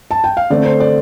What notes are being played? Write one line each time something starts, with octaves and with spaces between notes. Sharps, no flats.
A5
G5
F5
D3 A3 C4 D5
C5
D5